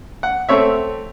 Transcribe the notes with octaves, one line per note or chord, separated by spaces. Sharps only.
F#5
A3 C4 C#5 E5